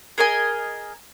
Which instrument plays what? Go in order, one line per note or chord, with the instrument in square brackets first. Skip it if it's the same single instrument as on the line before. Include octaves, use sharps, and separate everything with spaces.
[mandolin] G#4 A#4 D#5 G#5